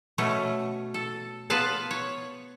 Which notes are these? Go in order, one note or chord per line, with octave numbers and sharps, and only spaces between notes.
B2 A3 C#4
A4
B3 F4 B4 F5 A5
C#5